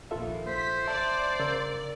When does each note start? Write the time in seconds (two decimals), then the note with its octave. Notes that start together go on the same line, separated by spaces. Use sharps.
0.11 A#1 D#2 F4 A4 E5
0.47 C5 B6
0.87 D5 E5 A5 C6
1.40 C#3 A#4 E6